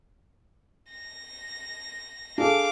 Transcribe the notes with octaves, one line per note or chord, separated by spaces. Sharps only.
A#6
D4 G#4 A4 F5 D6